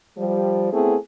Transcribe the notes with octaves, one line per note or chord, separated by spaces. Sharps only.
F3 G3
A3 B3 C4 E4 G#4